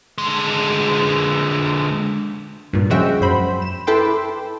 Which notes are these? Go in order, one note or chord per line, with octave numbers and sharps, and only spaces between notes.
D3 G#3
G2 A#2
C#3 F3 G#3 F#4 E5 G5
F#2 C5 B5
E7
E4 A4 B4 G5 C6 D6